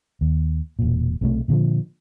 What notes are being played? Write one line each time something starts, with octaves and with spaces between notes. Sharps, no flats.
D#2
E1 A#2
B1 C3 D#3 A3
A#2 D3 D#3 F3